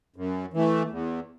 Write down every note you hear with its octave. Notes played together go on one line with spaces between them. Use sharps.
F#2
E3 A3
E2